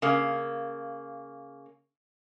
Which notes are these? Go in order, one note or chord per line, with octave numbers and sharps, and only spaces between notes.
C#3 A#3